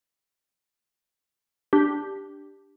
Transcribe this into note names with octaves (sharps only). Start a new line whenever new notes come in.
D4 G4